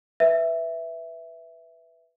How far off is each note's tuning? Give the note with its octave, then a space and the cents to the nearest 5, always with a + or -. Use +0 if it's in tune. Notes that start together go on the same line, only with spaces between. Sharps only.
B4 +0 E5 +0